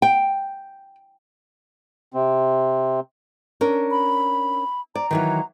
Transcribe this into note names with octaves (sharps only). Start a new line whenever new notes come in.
G5
C3 C4
C#4 D4 A#4
B5
D5 A#5
D#3 E3 F#3